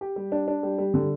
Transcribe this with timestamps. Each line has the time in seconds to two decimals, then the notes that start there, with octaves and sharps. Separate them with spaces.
0.01 G4
0.16 G3
0.32 D4
0.48 D4
0.63 G3
0.78 G3
0.94 D3